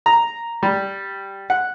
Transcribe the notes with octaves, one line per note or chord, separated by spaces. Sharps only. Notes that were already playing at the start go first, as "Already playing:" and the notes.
A#5
G3
F#5